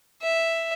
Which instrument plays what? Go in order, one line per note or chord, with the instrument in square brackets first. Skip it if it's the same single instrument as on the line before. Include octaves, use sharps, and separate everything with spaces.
[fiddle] E5